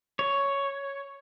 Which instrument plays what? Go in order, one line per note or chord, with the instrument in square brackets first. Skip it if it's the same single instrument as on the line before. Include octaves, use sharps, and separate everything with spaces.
[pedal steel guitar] C#5